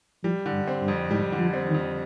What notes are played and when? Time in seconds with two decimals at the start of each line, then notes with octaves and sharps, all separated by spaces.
0.24 F3 G3
0.46 D3
0.52 G2
0.68 C4
0.82 G2
0.88 F2
1.10 G#2 G3
1.32 D3
1.39 F3
1.54 C4
1.68 D#3
1.74 F2